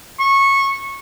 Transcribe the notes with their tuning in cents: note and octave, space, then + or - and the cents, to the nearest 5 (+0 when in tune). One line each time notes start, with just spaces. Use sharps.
C#6 -15